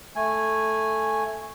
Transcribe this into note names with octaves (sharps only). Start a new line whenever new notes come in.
A3 G#5